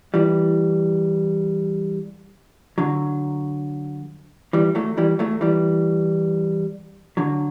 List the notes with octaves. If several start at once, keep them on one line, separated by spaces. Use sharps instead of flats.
E3 G3
D3 F#3
E3 G3
F#3 A3
E3 G3
F#3 A3
E3 G3
D3 F#3